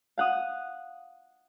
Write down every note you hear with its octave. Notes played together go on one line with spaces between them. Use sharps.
F5 F#5 D#6